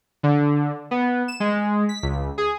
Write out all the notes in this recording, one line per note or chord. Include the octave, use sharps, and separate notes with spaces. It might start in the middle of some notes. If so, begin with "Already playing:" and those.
D3
B3
E7
G#3
B6
C#2
G#4